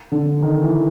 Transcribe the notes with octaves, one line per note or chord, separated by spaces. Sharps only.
D3
D#3
E3